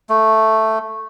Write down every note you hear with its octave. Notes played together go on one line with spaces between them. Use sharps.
A3